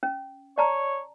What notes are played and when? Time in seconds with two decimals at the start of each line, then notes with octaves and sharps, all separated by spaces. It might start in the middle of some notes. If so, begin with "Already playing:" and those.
0.03 C#4
0.58 C#5 D5 A5 A#5